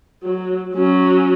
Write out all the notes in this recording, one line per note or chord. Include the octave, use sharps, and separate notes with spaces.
F#3
F#3 C#4